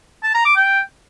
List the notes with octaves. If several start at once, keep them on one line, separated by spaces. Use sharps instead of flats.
A5
A#5
D6
G5